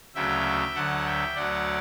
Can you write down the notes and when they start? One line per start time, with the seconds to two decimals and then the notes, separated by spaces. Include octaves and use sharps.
0.15 D2 C#3 F#3 E5 G5
0.75 D2 D3 F#3 F#5 A5
1.06 E5 G5
1.35 D2 D3 F#3 D5 F#5